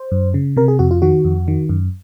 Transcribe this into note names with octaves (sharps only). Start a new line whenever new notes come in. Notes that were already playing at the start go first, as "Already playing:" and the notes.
Already playing: C5
F#2
C#3
C3 A#4
G#4
F2 F#4
F4
D#3 F#4
F2
D#3
F#2